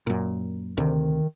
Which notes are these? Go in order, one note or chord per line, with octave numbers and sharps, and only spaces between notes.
F#2 A#2
D2 C3 D#3